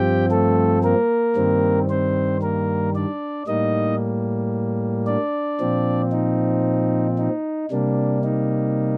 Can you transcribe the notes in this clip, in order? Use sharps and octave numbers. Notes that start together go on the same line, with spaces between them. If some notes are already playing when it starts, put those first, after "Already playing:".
Already playing: G2 F3 C4 G4 G5
A3 A4
A#3 A#4
G2 D#3 G3 C4
C4 C5
A#3 A#4
D4 D5
A2 G3 A#3 D#4 D#5
D4 D5
A#2 F3 C4
D#4
D#4
C3 G3 A#3 D4
D#4